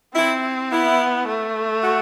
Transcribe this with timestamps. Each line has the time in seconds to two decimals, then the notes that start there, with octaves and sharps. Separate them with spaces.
0.15 C4 E4
0.72 B3 E4
1.28 A3
1.83 F#4